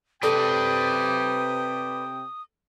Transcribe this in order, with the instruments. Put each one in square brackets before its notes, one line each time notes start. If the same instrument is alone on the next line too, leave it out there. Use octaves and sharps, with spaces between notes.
[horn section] C3 G5 [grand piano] A4 [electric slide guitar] B4 D5 [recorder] D#6